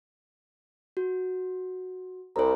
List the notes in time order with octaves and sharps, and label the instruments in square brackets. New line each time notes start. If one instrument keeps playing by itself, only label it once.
[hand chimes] F#4
[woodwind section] C2 [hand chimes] C5 A#5